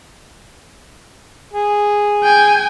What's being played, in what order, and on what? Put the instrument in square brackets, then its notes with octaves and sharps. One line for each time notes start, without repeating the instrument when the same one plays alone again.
[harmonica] G#4
[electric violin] G5 G#5